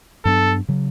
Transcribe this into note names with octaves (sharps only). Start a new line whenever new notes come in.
G2 F#3 B3 D4 A4
C#3 F#3